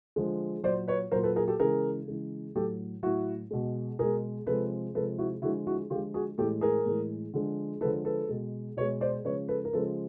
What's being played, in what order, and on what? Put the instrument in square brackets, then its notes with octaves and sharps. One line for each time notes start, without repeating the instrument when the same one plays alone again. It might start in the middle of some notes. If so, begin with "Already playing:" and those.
[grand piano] D3 F3 G#3
A#2 F#3 C5 D5
B4 C#5
A#2 F#3 A#4 C5
A4 B4
G#4 A#4
G4 A4
C#3 E3 G#3 G#4 A#4
C#3 E3 G#3
A2 F#3 G4 A4
A2 F#3 E4 F#4
B2 G#3
B2 G#3 G#4 A#4
C3 F3 G#3 A4 B4
C3 F3 G#3 A4 B4
E4 F#4
D3 F3 G#3 E4 F#4
E4 F#4
D3 F3 G#3 F4 G4
F#4 G#4
A2 E3 G#3 G4 A4
G#4 A#4
A2 E3 G#3
D3 F3 G#3
D3 F3 G#3 A4 B4
A4 B4
B2 G#3
B2 B4 C#5
G#3
C5 D5
C#3 F3 G#3 B4 C#5
A4 B4
A#4
C#3 F3 G#3 A4 B4